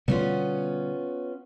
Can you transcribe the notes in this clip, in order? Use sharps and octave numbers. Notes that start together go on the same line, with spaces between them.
B2 D3 G3 B3 C#4 F4